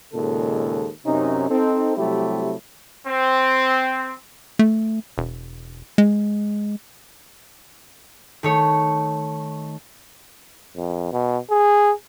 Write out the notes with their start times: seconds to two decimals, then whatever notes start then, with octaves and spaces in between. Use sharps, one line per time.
0.13 D#2 A#2 C#3 G#3 A4
1.06 F#2 C3 C#4 D#4
1.49 C4 D#4 A4
1.97 C3 F#3 G3 A3 E4 G4
3.07 C4
4.59 A3
5.18 E1
5.98 G#3
8.43 D#3 A3 C#5
10.76 F2
11.12 B2
11.50 G#4